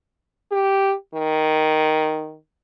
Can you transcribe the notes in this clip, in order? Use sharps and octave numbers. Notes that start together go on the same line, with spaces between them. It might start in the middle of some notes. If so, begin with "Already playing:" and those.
G4
D#3